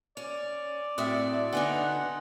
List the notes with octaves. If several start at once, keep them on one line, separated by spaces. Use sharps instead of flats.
C#4 D5 F7
A2 C4 F#4 E5 C6 D#6
D3 B3 D#4 F#5 G#5 C6